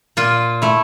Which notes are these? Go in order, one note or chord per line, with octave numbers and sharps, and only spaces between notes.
A#2 F4
A3 E4